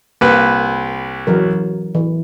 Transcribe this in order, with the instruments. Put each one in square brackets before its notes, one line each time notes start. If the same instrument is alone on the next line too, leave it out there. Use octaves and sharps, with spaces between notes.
[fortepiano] C2 B4 [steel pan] A#3
[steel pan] E3 F#3 A#4
E3